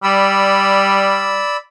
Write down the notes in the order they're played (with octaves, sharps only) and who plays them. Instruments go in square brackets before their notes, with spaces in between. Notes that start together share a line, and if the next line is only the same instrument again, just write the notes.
[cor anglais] G3 [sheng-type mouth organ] D5 B5 E6